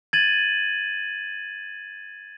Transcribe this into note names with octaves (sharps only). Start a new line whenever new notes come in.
G#6 A6 D#7 F#7